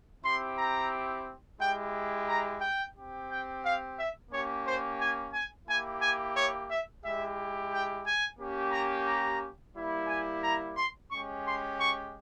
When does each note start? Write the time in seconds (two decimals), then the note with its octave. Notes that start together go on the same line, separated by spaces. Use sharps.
0.23 C4 E4 G4 C6
0.57 A#5
1.60 G#3 E4 G4 G5
2.27 A#5
2.61 G5
2.95 C4 G4
3.29 G5
3.63 F5
3.97 E5
4.30 A#3 C#4 G4 C#5
4.65 C5
4.99 G#5
5.32 G#5
5.66 A#3 E4 G4 G#5
6.01 G#5
6.35 C#5
6.69 E5
7.02 G#3 E4 G4 E5
7.71 G5
8.05 G#5
8.38 A#3 C#4 G4
8.72 A#5
9.07 A#5
9.75 G3 A#3 E4
10.08 G#5
10.42 A#5
10.76 C6
11.10 G#3 C#4 G4 C#6
11.44 C6
11.79 C#6